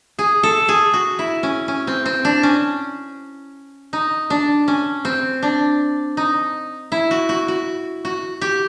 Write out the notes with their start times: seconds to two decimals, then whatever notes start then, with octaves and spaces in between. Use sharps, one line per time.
0.19 G#4
0.43 A4
0.69 G#4
0.93 F#4
1.19 E4
1.43 C#4
1.68 C#4
1.87 C4
2.06 C4
2.25 D4
2.43 C#4
3.93 D#4
4.30 D4
4.68 C#4
5.05 C4
5.43 D4
6.17 D#4
6.92 E4
7.11 F#4
7.29 F#4
7.48 F#4
8.05 F#4
8.42 G4